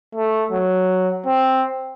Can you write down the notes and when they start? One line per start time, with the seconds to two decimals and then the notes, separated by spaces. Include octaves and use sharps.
0.15 A3
0.51 F#3
1.26 C4